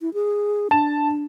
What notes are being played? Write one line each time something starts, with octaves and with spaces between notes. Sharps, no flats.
E4
G#4
D4 A5 E7